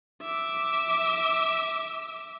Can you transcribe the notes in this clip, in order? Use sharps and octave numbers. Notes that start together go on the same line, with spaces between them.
E5 D6